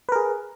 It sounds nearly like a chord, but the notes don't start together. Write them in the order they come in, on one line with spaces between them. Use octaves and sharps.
B4 A#4 G#4